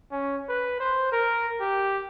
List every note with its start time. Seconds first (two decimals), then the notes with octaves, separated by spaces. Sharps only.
0.12 C#4
0.49 B4
0.80 C5
1.12 A#4
1.60 G4